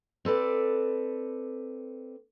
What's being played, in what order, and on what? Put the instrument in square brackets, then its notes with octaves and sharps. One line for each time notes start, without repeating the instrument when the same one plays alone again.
[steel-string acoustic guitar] C4 A4 B4 D5